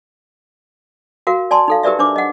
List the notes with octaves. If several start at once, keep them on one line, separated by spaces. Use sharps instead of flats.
F#4 A#4 F5
D5 G#5 A5 C6
D#4 A4 F5
G4 A#4 B4 D5 E5
D4 C5 D6
D#5 F#5